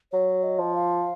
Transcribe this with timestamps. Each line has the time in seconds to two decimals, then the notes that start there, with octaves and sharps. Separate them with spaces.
0.12 F#3 C#5
0.43 D#5
0.59 F3
0.75 F5